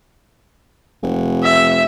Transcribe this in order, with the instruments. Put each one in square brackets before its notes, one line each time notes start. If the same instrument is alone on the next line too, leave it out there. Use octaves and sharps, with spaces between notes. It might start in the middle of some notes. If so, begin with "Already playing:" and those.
[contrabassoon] F1
[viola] E5